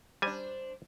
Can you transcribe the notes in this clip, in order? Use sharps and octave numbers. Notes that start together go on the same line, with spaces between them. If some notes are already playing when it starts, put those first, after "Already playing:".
G3 D4 C5 G#5